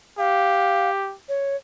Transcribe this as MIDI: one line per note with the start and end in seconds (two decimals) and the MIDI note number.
0.19 1.15 67
0.19 0.90 77
1.29 1.56 73